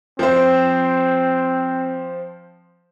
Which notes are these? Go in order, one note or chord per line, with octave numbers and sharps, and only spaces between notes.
F3 C4 C5